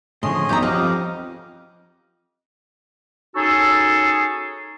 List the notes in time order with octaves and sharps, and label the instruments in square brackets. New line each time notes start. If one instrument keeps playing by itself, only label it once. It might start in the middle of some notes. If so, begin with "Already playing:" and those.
[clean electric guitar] A2 D3 F3 [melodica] C#4 G#4 D#5 [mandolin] C6
[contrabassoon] B1 [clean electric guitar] G2 E3 [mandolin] G4 A4 A#5
[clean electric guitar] F3 [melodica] G4 F5 [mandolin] D#5 F#5
[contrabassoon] F2
[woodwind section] C#4 D#4 F#4 G#4 A4